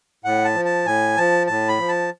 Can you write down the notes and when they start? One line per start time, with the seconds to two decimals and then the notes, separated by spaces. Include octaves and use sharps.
0.25 A2 F#5
0.45 A5
0.55 F3
0.65 A5
0.85 A2 G#5
1.17 F3 A5
1.47 A2 A5
1.69 B5
1.79 F3
1.88 A5